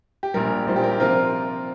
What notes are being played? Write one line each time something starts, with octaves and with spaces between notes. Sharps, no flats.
G4
A#1 A#2 G3 A#4
A#1 A#2 G3 C5
G4
A#4
G4
C3 F3 C4 F4 A#4